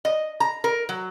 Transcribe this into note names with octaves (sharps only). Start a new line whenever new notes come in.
D#5
A#5
A#4
F#3